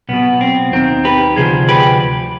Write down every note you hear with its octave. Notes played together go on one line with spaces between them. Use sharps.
B1 B2 B3
C4
D#2 D#3 C4
G4 B4
D2 C3 F3 G#4 C5
G4 B4